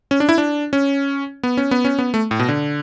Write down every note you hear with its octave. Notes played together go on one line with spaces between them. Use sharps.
C#4
D4
E4
D4
C#4
B3
C#4
B3
C#4
B3
A3
A2
B2
D3